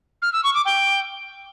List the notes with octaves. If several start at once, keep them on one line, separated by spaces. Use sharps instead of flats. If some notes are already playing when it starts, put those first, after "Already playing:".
F6
E6
C#6
D6
G5